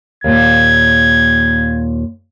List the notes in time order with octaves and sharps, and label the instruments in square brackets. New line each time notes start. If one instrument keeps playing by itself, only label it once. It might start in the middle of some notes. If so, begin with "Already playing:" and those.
[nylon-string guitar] D#2 A#2 [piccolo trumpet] G#6